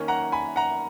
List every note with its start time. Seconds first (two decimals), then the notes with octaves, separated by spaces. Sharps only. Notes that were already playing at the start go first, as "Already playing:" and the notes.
Already playing: D#3 A#3 C#4
0.08 F#5 A#5
0.32 G#5 B5
0.56 F#5 A#5